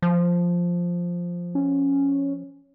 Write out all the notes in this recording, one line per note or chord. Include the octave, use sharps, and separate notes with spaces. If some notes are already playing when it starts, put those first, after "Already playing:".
F3
C#4